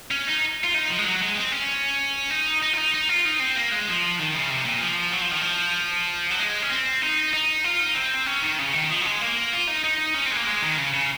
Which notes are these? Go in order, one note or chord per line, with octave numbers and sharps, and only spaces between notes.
C#4
D#4
F4
D#4
F3
G#3
F#3
G#3
C4
C#4
D#4
D#4
F4
D#4
D#4
F4
D#4
C4
A#3
G#3
F3
D#3
C#3
C3
A#2
F3
F#3
F3
D#3
F3
F#3
G#3
C#4
C4
D#4
D#4
F4
D#4
C4
C#4
D#3
C#3
D#3
F3
F#3
G#3
A#3
F4
D#4
D#4
C#4
C4
G#3
A#3
G#3
D#3
C#3
C#3